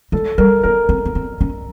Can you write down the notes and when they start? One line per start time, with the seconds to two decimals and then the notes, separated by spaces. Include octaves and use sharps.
0.12 G#3 A4
0.38 G3 A#4
0.63 B3 A#4
0.89 C4
1.05 B3
1.15 C4
1.41 C#4